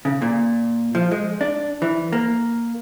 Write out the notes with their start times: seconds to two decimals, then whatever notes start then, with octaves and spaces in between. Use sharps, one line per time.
0.05 C#3
0.22 A#2
0.95 F3
1.11 G#3
1.41 D4
1.82 E3
2.13 A#3